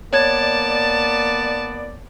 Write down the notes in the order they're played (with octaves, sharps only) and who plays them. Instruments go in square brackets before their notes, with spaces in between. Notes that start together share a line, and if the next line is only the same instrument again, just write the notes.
[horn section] A#3 B3 D5 [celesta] C#5 G#6 [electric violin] A5